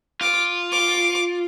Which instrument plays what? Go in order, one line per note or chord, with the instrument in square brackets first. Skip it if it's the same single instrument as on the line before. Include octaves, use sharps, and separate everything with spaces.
[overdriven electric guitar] F4 [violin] D6
[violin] D6